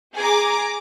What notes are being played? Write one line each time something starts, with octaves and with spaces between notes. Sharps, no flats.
G#4 G#5 A#5 D6